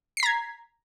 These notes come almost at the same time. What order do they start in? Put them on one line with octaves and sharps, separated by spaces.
C7 B6 A#5 G#6